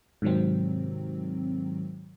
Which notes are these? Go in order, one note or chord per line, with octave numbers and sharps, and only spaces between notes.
G#2 C3 D#3 F#3 C4